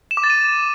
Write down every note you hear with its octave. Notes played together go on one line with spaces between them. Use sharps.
E7
D6
A6
D#7